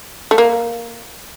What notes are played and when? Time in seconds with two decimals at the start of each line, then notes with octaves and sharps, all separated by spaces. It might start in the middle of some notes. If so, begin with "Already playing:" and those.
0.31 A3
0.38 A#3